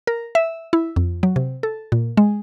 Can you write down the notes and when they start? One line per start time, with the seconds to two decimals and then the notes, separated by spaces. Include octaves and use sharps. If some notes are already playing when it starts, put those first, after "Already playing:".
0.07 A#4
0.35 E5
0.73 E4
0.96 F2
1.23 F#3
1.36 C3
1.63 A4
1.92 A#2
2.17 G#3